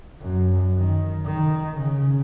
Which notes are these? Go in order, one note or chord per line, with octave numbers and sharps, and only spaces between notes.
F#2
D#3
D#3
C#3